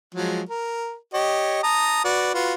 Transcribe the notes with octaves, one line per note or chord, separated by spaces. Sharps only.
F3 F#3 G#3
A#4
G4 C#5 D#5
A5 A#5 D#6
F#4 B4 D5
F4 F#4 B4